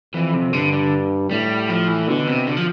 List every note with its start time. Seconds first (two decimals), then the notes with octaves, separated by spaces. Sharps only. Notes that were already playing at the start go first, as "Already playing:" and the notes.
0.14 F2 E3
0.34 C3
0.52 G2 D3
0.73 D3
1.31 A2 G3
1.69 F3
1.88 E3
2.08 B2 D3
2.28 C3
2.46 D3
2.57 F3